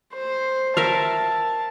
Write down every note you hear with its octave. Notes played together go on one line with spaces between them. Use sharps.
C5
A#4 E5 F5 A5